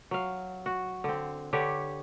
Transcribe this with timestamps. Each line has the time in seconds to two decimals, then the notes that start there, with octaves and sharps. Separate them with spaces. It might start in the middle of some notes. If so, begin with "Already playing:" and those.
0.11 F#3 F5
0.66 F#4
1.04 D3 C4
1.53 D3 G4 B4 C#5